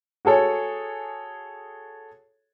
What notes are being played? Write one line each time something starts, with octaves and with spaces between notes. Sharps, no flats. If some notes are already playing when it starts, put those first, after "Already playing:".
F#4 G#4 A4 C#5